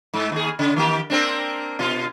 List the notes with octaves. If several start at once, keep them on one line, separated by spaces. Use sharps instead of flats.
G#2
D#2 G#4
C#3
D#3 A#3 G4
A#3 C4 D4
B2 F4